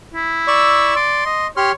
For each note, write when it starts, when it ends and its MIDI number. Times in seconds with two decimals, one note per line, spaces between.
0.14 0.94 64
0.48 0.96 74
0.48 0.96 85
0.48 0.96 88
0.96 1.22 74
0.96 1.47 84
1.26 1.47 75
1.57 1.72 67
1.57 1.72 73
1.57 1.72 84
1.57 1.72 89